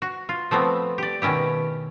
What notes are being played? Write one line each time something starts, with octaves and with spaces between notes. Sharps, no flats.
F#4
F4
F3 A3 B3 C4
G4 D5
B2 D#3 C#4 E4 G4